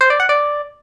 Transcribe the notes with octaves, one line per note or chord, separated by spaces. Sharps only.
C5
D5
F#5
D5